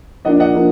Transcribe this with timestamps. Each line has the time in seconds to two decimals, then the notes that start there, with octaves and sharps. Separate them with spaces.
0.25 F3 A#3 D4 D#5 F#5
0.40 D#5 F#5
0.55 F3 A#3 D4